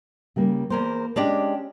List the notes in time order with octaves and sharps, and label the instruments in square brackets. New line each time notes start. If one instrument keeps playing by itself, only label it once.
[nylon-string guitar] C#3 G3 A#3
[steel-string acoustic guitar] E2 A#4 C5 [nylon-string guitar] A#3
[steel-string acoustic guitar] G#3 D4 G4 [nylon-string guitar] C#4